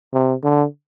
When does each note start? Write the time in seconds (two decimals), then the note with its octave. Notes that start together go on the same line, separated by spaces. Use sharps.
0.13 C3
0.44 D3